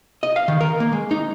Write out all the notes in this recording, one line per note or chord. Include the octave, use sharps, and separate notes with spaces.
D#5
F5
D#3
A#4
A#3
G#3
D#4